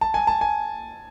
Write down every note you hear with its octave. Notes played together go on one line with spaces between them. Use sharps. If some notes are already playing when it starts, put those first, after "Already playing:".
A5
G#5
A5
G#5